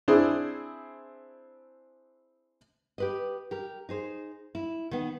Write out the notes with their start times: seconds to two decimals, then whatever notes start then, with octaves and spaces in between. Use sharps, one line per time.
0.08 C4 D4 E4 G#4 C5
2.98 G4 B4 D#5
3.51 G4 A#4
3.89 D#4 G#4 C5
4.55 E4
4.91 D#3 B3